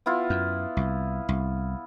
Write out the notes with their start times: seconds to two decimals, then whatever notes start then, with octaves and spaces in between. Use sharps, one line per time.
0.06 B3 E4 F4
0.30 F#2
0.77 C2
1.29 C2